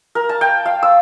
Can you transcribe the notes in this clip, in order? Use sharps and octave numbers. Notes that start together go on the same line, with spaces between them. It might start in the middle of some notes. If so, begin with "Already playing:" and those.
A#4
A5
G5
F5
E6